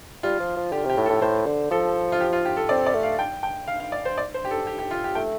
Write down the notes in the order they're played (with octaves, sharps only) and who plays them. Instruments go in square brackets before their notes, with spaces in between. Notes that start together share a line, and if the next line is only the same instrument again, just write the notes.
[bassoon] G3 [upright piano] F4
[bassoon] F3
F3
[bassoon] D3 [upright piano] G4
[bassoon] C3 [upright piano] G4
[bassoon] A2
[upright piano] A4
[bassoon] A2
[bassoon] A2 [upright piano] C5
[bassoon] D3
[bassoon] F3 [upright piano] A4
[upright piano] F4
G4
F4
G4
A4
[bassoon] C4 [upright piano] D5
[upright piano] D5
[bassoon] A3
[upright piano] F5
G5
G5
F5
F5
D5
C5
D5
C5
G4
A4
G4
G4
F4
G4
[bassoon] A3 [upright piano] G5